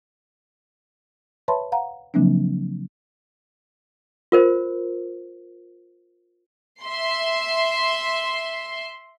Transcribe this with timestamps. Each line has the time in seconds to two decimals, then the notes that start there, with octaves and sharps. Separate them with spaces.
1.48 B4 C#5 E5 A5 B5 C6
1.72 F5 F#5 A#5
2.14 C#3 F3 F#3 A#3 C4 D4
4.32 F4 A#4 C5
6.83 E5 C6